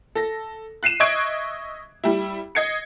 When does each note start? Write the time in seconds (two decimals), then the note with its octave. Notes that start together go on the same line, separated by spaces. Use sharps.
0.15 A4 A#6
0.83 F#6 C7 D#7 E7
1.00 D#5 E5 C#6 F#6 G#6 D7
2.04 G3 E4
2.55 D#5 G#6 C7 C#7